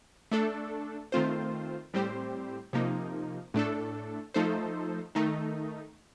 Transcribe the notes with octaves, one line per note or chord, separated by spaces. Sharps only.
A3 D4 A4
D#3 A3 C4 F4 C5
A2 G3 C4 G4 C5
C3 F3 A#3 D#4
A2 A3 D4 A4
F3 A3 D#4 A4 C5
D#3 A3 D#4